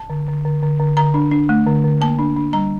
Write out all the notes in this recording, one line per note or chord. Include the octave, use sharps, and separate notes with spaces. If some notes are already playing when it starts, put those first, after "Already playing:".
Already playing: A5
D3
D3
D3
D3
D3
D3 A#5
D4
D4
A3
D3
D3
A#3 A5
D4
D4
G3 A#5